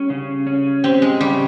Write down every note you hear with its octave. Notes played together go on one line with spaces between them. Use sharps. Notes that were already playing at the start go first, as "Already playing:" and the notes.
Already playing: G3 C#4
C#3
C#4
C4 G4
G#3
C#3 G3